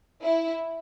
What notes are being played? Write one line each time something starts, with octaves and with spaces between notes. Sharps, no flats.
E4